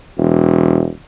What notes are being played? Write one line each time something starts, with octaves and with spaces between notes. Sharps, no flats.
E1